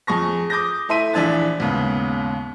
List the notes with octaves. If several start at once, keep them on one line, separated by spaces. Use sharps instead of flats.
F2 G#4 C#6 A#6
D6 D#6 G6 A#6
A3 E4 E5 C6 D#7
A#1 E3 D4 E5 G#6 A6
D#2 G#2 C#3 B3